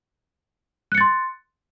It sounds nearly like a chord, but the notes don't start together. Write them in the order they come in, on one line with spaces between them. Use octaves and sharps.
F#6 C#7 A6 C6